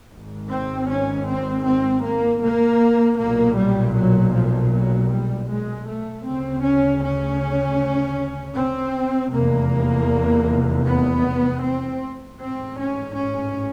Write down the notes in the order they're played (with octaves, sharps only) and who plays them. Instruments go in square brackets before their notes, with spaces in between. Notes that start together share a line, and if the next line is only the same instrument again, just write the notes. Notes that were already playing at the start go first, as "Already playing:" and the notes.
[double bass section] G#1 G#2
C4
C#4
C4
C4
A#3
A#3
B1 A#2 A#3
G3
F#3
F3
F#3
G3
G#3
A3
D2 C#3 C4
C#4
C#4
C4
F1 E2 C3 A#3
B3
C4
A1 G#2 C4
C#4
C#4